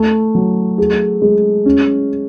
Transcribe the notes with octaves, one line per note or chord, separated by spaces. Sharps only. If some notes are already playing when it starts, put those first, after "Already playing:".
Already playing: A3
F#3
G#4
G#3
C#4